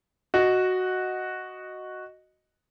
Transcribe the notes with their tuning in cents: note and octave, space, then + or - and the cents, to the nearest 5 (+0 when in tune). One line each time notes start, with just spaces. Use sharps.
F#4 +0 D#5 +0